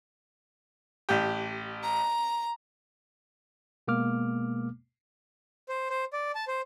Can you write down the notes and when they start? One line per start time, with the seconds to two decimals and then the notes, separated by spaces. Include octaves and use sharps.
1.09 A1 G4
1.83 A#5
3.88 B2 G#3 A#3 B3 D6 F6
5.69 C5
5.90 C5
6.13 D5
6.35 A5
6.48 C5